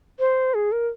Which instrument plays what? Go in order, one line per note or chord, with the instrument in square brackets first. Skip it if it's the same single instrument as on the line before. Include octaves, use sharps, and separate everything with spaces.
[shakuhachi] C5
G#4
A#4